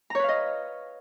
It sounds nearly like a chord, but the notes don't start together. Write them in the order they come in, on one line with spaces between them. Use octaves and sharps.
A#5 C#5 B4 F5 D#5